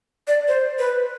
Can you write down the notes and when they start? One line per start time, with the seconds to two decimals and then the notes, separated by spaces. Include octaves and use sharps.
0.28 D5
0.48 C5
0.79 B4